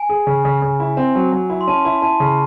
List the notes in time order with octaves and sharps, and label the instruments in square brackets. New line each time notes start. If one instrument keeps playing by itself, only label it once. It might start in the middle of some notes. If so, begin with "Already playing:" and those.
Already playing: [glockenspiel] G#5
[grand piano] G#4
C#3
C#3
C#3
E4
C4
F#3
F#3
E4
[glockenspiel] C6
[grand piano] C#4 [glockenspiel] A5
[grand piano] E4
[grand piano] E4 [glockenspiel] A5
[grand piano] C#3